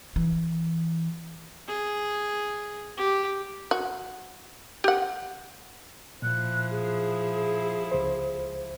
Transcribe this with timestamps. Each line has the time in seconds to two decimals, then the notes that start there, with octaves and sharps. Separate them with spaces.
0.16 E3
1.68 G#4
2.97 G4
3.71 F#4
4.84 G4 F#5
6.22 A#2 F3 E4 F#6
6.70 G#4
7.92 C#2 C5